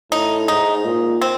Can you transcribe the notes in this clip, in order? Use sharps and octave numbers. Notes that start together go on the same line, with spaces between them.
A2 D#4
G#2 D#4
A#2
C4